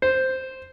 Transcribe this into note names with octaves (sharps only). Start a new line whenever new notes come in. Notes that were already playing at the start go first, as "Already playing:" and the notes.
C5